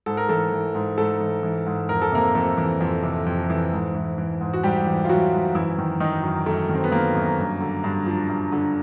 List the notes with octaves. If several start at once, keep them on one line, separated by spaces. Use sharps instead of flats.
G#2 A4
A#4
E3 A3 A4
E3
G#2
G#2 A3 A4
E3
E3
G#2
F2 A#4
A4
C3 A#3 A#4
F2 A3 A4
E3
F2
C3
F2
E3
G#2
E3
E3
G#2
F#4
G#2 G3 G4
E3
F4
E3 F#3 F#4
G#2
F#2 E3 E4
D#3
D#3 D#4
F#2
F#2 A3
D#3
C4
B3
D#3 A#3
F#2
G2
D3
G2
F3
G2
D3